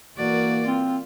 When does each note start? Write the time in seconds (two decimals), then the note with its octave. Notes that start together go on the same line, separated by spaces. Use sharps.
0.17 E3 A#3 F#4 D5
0.66 C4 F4